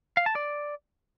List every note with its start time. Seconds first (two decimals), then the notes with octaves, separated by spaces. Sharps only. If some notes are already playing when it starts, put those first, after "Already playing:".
0.17 F5
0.26 A5
0.35 D5